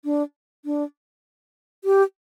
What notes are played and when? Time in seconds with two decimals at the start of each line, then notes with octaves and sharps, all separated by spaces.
0.05 D4
0.65 D4
1.84 G4